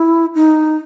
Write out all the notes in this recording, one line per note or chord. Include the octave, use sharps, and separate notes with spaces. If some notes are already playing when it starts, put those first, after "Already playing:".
Already playing: E4
D#4